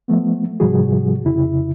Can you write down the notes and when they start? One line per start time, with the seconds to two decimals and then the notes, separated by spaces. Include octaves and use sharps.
0.08 F3 A3 B3
0.60 G#2 C3 F3 G3 F#4 G#4
1.24 F2 C#3 E4